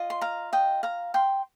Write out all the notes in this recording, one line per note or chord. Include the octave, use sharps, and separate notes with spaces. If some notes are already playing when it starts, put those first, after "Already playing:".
Already playing: F4 D#5
C6
F5 A#5
D#5 G5
F5 A#5
G5 C6